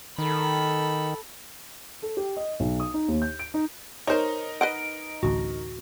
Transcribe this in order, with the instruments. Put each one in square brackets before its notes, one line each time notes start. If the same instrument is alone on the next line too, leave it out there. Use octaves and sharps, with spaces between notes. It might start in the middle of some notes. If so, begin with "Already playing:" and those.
[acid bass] D#3 [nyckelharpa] A4 B5
[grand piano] A4
G4
D#5
B1
D#6
D#4
D#2
G6
D7
D#4
[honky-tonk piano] D#4 A#4 [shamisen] C5 C#5
[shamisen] B4 D#5 F#5 [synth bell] D7
[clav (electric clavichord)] A1 D2 [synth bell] F#4